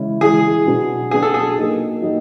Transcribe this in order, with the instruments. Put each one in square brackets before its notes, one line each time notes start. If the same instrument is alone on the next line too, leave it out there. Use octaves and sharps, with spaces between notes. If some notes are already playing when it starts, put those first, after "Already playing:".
Already playing: [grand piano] C#3 E3 G#3 C#4 E4
[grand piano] C#3 E3 G#3 C#4 E4 [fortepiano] G#4
[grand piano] B2 F#3 B3 D4
[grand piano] B2 F#3 B3 D4 [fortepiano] G#4
[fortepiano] A4
G#4
[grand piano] F#3 A#3 D#4 G4
F#3 A#3 D#4 G4